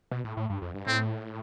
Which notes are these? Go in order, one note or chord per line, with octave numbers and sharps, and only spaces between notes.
B2
A2
A2
G2
F2
G2
A2 C4